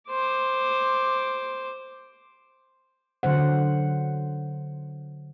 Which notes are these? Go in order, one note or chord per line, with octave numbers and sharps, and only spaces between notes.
C5 D6
D3 F#3 C5 F#5